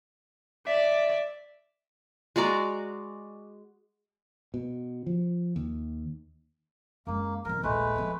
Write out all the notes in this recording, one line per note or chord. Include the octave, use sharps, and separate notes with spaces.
D5 E5
G#3 F#4 D5 A#5
B2
F3
D#2
F#2 G#3 A#3
B1 F3 A#4
A#1 D#2 G#3 A3 B4
F3 B3